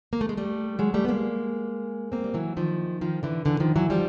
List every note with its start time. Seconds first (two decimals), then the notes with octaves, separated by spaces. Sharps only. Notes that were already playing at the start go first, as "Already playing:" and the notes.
0.13 A#3
0.21 A3
0.29 G#3
0.37 G3 A3
0.79 F#3 G#3
0.94 G3 A3
1.05 B3
1.08 G#3 A#3
2.12 A#3 C4
2.24 G3
2.34 E3 F#3
2.57 D#3 F3
3.01 D#3 F3
3.23 D3 E3
3.45 D3 E3
3.60 D#3 F3
3.76 E3 F#3
3.90 F3 G3